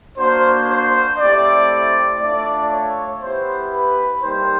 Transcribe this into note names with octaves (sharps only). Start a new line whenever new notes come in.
A#3 D4 F#4 C5
C5
A3 C4 E4 G4 D5
A3 D4 F4 D5
C#5
B3 E4 G4 C5
B4
G3 A#3 D#4 G4 C5